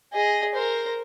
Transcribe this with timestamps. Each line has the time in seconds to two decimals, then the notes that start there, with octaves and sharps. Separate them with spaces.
0.13 G#4 D#5
0.54 A#4 C5